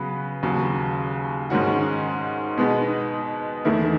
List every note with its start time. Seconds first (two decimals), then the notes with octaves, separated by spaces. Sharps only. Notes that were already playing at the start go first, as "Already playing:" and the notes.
Already playing: C#3 F#3 B3 B4
0.43 D#2 C#3 F#3
1.50 G#2 D#3 G#3 C#4 F#4
2.58 B2 G#3 B3 D#4
3.65 E2 D#3 A3 E4